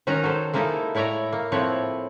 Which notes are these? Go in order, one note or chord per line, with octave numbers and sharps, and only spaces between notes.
D#3 F#3 C#4 D#4 F#4 A#5
F#3 A4 C5
G#3 A#3 D#4 E4 A4
A2 E4 C#5 D5 A#5
A#3
A2 F3 C4 E4 C#5 F#5